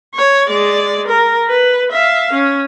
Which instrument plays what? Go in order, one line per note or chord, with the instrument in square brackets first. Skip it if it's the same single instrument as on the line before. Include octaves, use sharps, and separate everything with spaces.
[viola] C#5
G#3 D5
A#4
B4
E5 F5
C#4